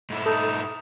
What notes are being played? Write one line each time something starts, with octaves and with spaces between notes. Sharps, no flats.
G#2 E4
D#4 A4